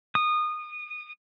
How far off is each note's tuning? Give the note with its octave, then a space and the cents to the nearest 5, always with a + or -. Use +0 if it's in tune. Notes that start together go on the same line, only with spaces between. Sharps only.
D#6 -25